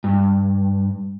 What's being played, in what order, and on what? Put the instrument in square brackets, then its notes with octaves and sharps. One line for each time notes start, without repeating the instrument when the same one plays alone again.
[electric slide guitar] G2